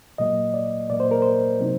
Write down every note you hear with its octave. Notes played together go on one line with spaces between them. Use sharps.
A#2 F#3 A#3 D#5
D5
A#2 F#3 A#3 D5
C5
A#4
C5
C3 F#3 C4 D#4